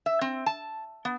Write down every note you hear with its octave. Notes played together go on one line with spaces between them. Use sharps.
E5
C4
A5
B3